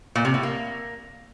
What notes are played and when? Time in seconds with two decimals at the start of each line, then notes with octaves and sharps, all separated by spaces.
0.15 A#2
0.25 C3
0.34 A2
0.43 A#3